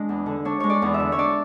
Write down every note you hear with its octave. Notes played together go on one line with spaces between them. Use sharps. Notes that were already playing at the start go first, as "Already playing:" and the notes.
Already playing: G#3 D4
E2
D3
D4 C#5
G#3 C#5
D5
E2
E5
D3
C#5
D4 D5